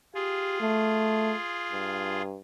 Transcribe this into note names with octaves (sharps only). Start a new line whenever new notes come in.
F4 G4 G#4
A3
G2